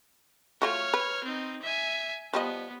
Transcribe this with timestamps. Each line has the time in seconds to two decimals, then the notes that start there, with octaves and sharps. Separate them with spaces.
0.62 A3 F4 F#4 C#5 F6
0.94 B4
1.24 C4 D#4
1.62 E5 G#5
2.33 F3 G3 B3 D#5